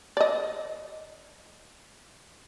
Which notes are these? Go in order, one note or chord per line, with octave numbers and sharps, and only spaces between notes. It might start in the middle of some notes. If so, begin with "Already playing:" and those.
D5 D#5